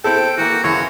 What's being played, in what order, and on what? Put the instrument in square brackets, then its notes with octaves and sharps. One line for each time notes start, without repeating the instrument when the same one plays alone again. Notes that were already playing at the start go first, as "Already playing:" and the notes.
[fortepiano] C4 E4 A4 [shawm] G5
[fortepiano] E3 A#3 [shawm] F#4
[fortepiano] F#2 C#3 E3 [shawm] C#5